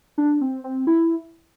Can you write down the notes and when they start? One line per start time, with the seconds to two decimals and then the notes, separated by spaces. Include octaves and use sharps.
0.18 D4
0.41 C4
0.64 C4
0.87 E4